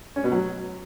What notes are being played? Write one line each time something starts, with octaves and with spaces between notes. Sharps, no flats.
C#4
B2
F#3